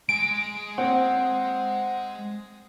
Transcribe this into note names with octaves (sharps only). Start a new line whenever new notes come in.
G#3 G#5 D7
C4 F#5